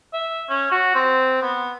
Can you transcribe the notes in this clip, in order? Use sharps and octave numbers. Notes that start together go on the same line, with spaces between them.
E5
C#4
F#4
C4
B3